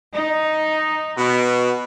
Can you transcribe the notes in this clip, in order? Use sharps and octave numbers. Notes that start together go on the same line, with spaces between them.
D#4
B2